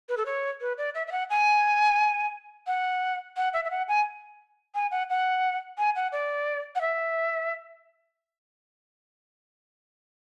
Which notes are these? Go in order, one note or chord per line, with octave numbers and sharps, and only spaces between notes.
B4
A4
C#5
B4
D5
E5
E5
F#5
G#5
F#5
F#5
E5
E5
F#5
G#5
G#5
F#5
F#5
G#5
F#5
D5
F#5
E5